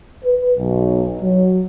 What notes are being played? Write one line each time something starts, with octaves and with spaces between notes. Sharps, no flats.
B4
B1
F#3